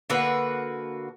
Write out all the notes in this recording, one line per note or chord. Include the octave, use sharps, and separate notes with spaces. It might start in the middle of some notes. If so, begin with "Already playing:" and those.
D3 A#3 F#4 B4